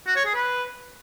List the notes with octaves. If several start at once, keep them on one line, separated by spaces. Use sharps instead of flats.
F#4
C#5
G#4
B4